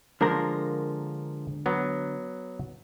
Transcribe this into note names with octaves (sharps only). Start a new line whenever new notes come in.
D3 F3 G#3 A#3 A#4
F#3 B3